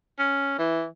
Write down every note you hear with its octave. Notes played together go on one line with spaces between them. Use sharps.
C#4
E3